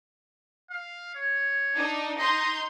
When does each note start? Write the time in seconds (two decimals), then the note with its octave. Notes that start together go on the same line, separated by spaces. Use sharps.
0.71 F5
1.15 C#5
1.74 D4 D#4
2.18 D#4 D#5 C6 G6